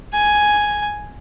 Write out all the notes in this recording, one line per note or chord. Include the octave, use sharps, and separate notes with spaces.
G#5